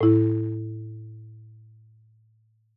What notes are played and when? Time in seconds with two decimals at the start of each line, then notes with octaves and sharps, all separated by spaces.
0.01 A2 E4